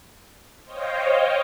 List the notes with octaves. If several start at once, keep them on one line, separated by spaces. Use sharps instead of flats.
C5 C#5 D#5 F5 G5